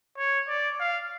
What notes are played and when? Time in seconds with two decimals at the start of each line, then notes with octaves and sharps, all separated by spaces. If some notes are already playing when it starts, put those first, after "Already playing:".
0.18 C#5
0.48 D5
0.80 F5